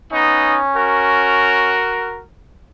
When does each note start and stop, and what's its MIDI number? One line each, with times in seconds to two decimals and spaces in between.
0.13 0.59 59
0.13 1.80 61
0.13 0.59 63
0.76 2.23 66
0.76 2.23 70